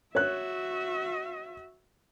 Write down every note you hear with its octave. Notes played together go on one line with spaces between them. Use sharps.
F#4 C#5 E5 F#6